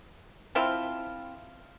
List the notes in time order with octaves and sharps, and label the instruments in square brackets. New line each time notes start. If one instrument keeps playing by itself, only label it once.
[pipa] F3 C4 E4 F4